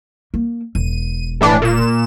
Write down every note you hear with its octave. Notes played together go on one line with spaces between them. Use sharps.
A#3
E1 D#7
A2 E3 D4
A#2 E7